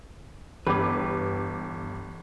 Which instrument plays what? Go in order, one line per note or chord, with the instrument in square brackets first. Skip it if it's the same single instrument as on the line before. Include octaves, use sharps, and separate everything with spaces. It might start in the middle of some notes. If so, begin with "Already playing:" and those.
[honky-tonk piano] G1 G4 D6 [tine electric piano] E3 [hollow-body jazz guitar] B4